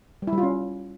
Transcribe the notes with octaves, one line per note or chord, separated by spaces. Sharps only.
G3
E4
G3
F4
C#4